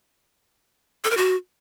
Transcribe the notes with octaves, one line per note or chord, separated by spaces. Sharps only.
A4
A#4
F#4